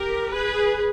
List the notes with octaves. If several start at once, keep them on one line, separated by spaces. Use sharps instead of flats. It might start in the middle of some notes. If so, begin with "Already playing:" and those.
Already playing: G4 A#4
G#4 B4